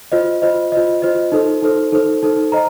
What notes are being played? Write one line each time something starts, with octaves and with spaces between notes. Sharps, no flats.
F4 C5 D#5
F4 C5 D#5
F4 C5 D#5
F4 C5 D#5
D#4 A4 C5
D#4 A4 C5
D#4 A4 C5
D#4 A4 C5
C5 D#5 A#5